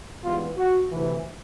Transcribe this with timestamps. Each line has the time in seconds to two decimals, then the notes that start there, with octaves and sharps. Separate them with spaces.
0.23 G#2 E3 G3 B3 F4
0.56 F#4
0.89 D2 C3 E3